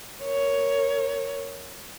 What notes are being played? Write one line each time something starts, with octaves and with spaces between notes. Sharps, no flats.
A#4 C#5